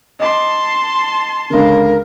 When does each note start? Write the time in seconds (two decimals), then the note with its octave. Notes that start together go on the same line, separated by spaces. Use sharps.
0.20 D#5 A5 C6 D6 C7
1.50 C#2 D3 A#4